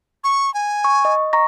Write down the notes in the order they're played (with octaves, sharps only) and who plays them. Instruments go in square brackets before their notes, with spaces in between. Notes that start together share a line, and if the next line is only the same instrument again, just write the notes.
[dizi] C#6
G#5
[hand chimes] C#6
D#5
A#5 C#6 A#6